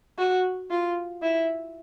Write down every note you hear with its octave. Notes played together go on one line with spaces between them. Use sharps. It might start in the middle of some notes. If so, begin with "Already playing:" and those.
F#4
F4
E4